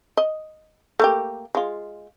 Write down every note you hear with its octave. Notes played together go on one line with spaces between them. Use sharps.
D#5
A3 A#3 G4
G#3 F4